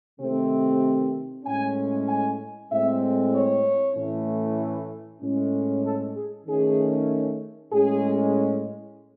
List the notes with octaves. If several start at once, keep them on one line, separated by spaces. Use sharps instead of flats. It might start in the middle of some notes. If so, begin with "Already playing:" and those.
C3 D#3 A3 C4
A2 G#3 C#4 G#5
G#5
A2 G#3 C4 E5
C#5
A2 E3 A3 C#4
A2 G#3 C#4
A4
G#4
D#3 A3 C#4 G#4
A2 G#3 C#4 G#4